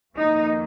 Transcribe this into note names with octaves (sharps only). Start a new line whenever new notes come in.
F2 D#3 A#3 D#4